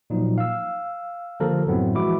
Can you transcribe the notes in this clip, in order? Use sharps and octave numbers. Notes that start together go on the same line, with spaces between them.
A#2 F3 F#3 D#4
F5 E6
D3 F3 A#3 G4 A4 A#4
F#2 A2 F#3 B3 C4 E4
E3 F3 G#3 E4 F#4 D6